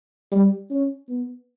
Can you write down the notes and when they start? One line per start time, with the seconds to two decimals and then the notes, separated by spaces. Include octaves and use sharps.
0.32 G3
0.70 C#4
1.09 B3